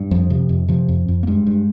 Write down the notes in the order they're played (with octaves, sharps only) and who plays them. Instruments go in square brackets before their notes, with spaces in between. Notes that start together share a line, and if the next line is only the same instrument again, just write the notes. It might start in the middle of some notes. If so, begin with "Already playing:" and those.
Already playing: [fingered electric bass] G2
F2 F3
C3
F2
C3 F3
F2
F2
A#3
G2 G#3
G2